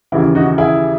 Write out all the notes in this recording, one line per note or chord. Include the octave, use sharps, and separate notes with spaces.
D#2 C#3 E3 E4
D#4 F#4
E4 G#4